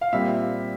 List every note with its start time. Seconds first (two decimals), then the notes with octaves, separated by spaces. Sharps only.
0.01 F5
0.13 A#2 G3 C4 E5